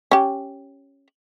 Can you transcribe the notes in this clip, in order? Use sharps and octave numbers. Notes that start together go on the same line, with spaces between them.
C#4 G4